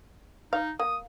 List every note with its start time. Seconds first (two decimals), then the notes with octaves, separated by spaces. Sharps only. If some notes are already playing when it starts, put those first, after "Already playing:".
0.53 D#4 F5
0.80 A#3 D#6